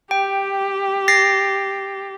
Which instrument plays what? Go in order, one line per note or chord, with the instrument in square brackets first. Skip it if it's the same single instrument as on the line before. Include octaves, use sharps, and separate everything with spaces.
[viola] G4 [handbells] G5
[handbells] A6 A#6 C7